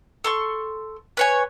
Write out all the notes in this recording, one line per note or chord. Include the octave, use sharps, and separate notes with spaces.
A4 C6 C#6
B4 C#5 G#5